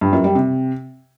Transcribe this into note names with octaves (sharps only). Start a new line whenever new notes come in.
G2
F#2
G3
C3